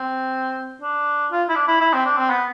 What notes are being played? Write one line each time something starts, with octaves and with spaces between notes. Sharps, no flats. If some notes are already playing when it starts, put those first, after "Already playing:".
Already playing: C4
D4
F4
E4
D4
E4
E4
C4
D4
C4
B3